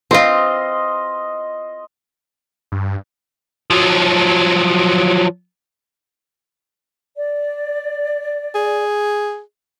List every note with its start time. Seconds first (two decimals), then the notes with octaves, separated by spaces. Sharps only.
0.11 C4 F4 D#5 C6
2.72 G2
3.71 F3 F#3
7.16 D5
8.55 G#4